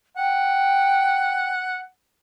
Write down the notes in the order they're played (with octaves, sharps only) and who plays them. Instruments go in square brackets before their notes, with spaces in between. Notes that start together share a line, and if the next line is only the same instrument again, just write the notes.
[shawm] F#5 [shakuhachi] G5